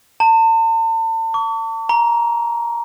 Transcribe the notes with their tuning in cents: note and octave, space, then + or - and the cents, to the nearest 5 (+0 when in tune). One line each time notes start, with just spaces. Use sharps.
A5 +40
C#6 +45
A#5 +15